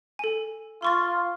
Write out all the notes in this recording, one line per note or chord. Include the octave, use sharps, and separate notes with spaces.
A4 G#5
F4 C6 C#6 A6